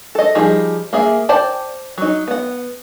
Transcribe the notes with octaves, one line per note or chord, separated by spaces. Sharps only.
A4 D#5
F3 G3 D#4 G#4
A#3 G#4 E5
C5 D5 G5 A5
F#3 D#4
B3 F#5